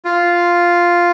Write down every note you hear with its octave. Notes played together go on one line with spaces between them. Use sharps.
F4